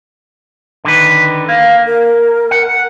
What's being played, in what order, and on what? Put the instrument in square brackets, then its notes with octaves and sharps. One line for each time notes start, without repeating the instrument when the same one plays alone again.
[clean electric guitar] D3 D#3 B4
[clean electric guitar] A#3 [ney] F5
[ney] A#4
[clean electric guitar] F#5